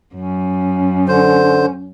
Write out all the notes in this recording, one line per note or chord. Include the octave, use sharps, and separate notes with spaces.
F#2 C#4
D3 C5